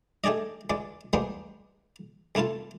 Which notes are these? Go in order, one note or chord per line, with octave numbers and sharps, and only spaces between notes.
A3 G4 G#4 D5 D#5
C#2 G#3 D5
G3 G#3 A#3 B3 D4 C5
C2 A3 E4 F4 A5